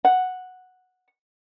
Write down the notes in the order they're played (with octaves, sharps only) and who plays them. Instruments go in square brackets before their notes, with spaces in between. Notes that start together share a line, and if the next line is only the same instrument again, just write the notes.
[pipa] F#5